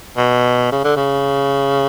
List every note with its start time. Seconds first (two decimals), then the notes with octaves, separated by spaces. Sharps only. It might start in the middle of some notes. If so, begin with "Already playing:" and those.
0.17 B2
0.72 C#3
0.84 D3
0.96 C#3